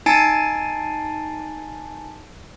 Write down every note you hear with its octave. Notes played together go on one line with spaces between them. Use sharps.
D#4 G#5 A5 A6 C7 D7